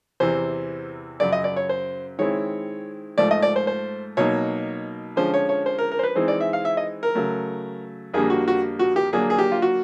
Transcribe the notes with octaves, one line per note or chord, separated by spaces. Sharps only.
E2 C3 E3 C5
F#2 C#3 F#3 D5
D#5
D5
C#5
C5
D#3 G#3 C4 E4 C#5
G#2 F3 A3 D5
D#5
D5
C5
C5
B2 F#3 A#3 D#4 C#5
D3 F3 G#3 C#4 C5
C#5
C#5
C5
A#4
A#4
C5
B4
E3 G#3 C4 D#4 C5
D5
E5
F5
E5
D#5
A#4
C#3 F#3 A3
F2 D3 G3 A#3 G#4
F#4
F#4
F#4
G4
D3 F#3 A#3 D4 G#4
G#4
G4
F4
F#4